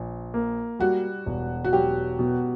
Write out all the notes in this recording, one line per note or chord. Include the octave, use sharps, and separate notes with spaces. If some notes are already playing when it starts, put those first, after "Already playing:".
Already playing: A#1
A#3
G3 F#4
E1
F#4
F#3 G4
B2